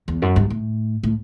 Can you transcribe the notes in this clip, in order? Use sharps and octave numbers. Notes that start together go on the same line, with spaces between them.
E2
F#2
G2
A2
A2